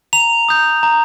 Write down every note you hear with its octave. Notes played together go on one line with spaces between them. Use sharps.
A#5 F7
D#6 G6
A#5